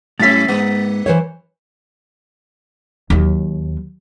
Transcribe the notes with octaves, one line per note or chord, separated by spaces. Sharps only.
A2 F#3 C#4 E4 E5 A6 B6
G#2 A#3
E3 C5 C#5
D#2 F#3